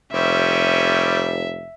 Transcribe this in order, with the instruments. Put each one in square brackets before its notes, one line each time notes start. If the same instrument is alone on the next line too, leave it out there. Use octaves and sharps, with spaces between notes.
[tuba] F1 [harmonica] G3 C4 C#4 [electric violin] E5